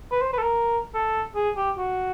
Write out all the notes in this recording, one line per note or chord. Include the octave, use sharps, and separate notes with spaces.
B4
C5
B4
A4
A#4
A4
G#4
G4
F#4